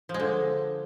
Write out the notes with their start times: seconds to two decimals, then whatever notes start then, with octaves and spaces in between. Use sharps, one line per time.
0.09 F3
0.14 G#3
0.20 D3